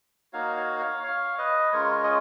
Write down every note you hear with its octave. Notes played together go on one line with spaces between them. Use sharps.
A#3 D#4 F#4 C#5 F5
C#5 F5
C#5 F5
C#5 F5
B4 D#5
G#3 C#4 F4 A#4 C#5
D#5